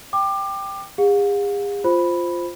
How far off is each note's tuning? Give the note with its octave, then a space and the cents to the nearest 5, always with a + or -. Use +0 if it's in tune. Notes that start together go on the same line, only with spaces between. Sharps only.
G5 +0 D6 +25
G#4 -45 F5 +45
F4 +0 C5 +0 B5 +0